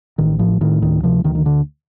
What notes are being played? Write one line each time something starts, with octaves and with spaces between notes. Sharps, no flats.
A1 D#3
A2 F3
A2 D#3
D2 D#3
C3 F3
D2 D#3
D#3
D3